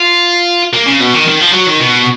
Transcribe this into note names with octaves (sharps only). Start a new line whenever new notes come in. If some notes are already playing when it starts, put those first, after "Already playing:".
Already playing: F4
A#3
C#3
B2
D#3
D#3
F3
F#3
D#3
B2